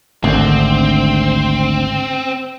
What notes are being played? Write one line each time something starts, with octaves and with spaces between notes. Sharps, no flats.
G#1 D2 D3 C4